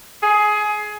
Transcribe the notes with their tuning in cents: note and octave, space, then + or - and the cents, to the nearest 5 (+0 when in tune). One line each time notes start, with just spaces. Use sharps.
G#4 +20